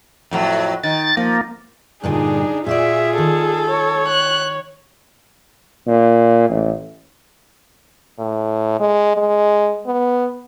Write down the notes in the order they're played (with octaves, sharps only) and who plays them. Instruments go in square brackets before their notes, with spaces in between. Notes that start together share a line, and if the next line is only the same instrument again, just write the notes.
[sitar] F2 A2 F#3
[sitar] D#3 [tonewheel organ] A6
[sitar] F3 [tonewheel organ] A#3
[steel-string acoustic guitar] G2 A#2 D3 [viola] D4 D#4 [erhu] G#4
[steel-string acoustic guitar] A#2 F#4 D5 [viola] F4 G#4 [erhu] E5
[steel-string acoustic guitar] D#3 [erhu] A4
[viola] C#5
[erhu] F#6
[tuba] A#2
A1
[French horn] A2
G#3
G#3
B3